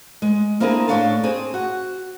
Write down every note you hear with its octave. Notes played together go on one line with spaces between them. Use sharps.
G#3
A#3 C4 D4 E4 G#4 A#4
A2 B3 D4 C#5 F5 A5
C4 G#4
F#4